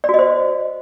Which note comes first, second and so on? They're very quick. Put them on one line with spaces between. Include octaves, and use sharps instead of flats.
D5 F#4 D#5 C5